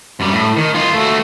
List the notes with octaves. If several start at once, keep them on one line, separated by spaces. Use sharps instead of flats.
F#2 G3
A2
D#3
F4 G#4
A3 F#4